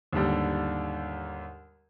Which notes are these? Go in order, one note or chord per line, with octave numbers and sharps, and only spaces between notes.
D#2 G#2 D3 G3